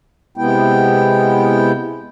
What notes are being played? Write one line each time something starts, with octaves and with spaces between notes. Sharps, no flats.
C3 G#3 B3 E4 G5